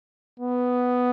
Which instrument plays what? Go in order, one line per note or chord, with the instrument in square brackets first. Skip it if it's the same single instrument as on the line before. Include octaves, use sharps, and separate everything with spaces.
[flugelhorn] B3